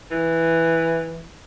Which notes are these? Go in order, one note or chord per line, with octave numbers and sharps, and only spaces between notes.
E3